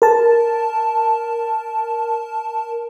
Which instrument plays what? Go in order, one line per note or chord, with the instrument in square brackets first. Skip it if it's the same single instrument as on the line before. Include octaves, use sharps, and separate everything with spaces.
[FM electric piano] A#4 A5